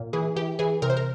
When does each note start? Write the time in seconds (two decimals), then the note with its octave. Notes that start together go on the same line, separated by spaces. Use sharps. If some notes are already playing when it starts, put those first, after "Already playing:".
Already playing: A#2
0.13 E3 G#4
0.36 E3 G4
0.59 E3 G#4
0.82 C3 A#4
0.90 C5
0.97 A#4